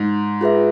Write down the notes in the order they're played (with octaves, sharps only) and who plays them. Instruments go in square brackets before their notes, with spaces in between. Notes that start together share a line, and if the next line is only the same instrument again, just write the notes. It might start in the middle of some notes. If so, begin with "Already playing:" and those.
Already playing: [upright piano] G#2
[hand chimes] F4 G#4 B4 E5